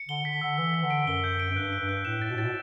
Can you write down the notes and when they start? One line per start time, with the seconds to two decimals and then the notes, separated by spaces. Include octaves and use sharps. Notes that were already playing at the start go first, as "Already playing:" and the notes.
Already playing: C#7
0.08 D3 G7
0.25 D3 B6
0.41 D3 E6
0.58 E3 E6
0.74 B6
0.83 D3
0.90 D7
1.07 F#2 G7
1.24 G6
1.40 D7
1.50 F#2
1.56 G2 F#6
1.73 D7
1.80 G2
1.89 F#6
2.05 A2 E7
2.22 A6
2.30 B2
2.37 A2 A6
2.44 B2